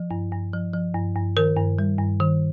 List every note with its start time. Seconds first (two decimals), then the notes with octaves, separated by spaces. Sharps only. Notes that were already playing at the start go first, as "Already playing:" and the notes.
Already playing: F3
0.11 G2
0.32 G2
0.53 F3
0.73 F3
0.95 G2
1.16 G2
1.37 D#3 A#4
1.57 G2
1.79 G3
1.99 G2
2.20 D#3